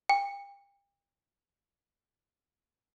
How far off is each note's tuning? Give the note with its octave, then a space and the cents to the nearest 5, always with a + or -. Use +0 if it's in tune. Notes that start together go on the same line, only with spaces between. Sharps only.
G5 +35